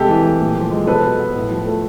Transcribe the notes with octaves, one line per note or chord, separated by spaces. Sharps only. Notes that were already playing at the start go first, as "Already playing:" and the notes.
Already playing: C3 G#3 G4 A4
E3
A3
A#2
F3
G#3
B2 A4 B4
F#3
B3
A2
F3
A3